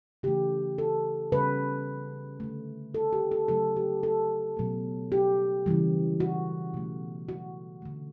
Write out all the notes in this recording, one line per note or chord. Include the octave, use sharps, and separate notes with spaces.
C#3 E3 A3 G4
A4
C#3 G3 B4
D3 A3
A4
G4
A4
C#3 F#3 A3 A4
G4
A4
B2 F#3 A3
G4
C#3 E3 G3
F#4
B2 A3
F#4
D3 A3